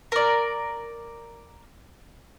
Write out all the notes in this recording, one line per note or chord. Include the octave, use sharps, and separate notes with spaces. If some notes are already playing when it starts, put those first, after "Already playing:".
A#4 D5